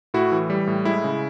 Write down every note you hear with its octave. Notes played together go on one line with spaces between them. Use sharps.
A2 E4 F#4
E3
G3
A2
G#3 E4
C#3